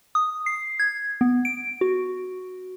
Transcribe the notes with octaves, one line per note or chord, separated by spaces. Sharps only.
D#6
C7
G#6
B3
D7
F#4